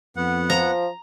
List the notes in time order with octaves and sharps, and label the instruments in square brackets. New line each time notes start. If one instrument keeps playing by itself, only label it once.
[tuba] F2 [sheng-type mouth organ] B3 F#5
[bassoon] F3 [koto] A#5